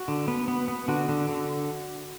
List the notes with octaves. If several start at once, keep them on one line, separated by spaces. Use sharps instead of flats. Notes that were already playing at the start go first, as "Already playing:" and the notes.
Already playing: F#4
D3
B3
B3
B3
D3 F#4
D3
D3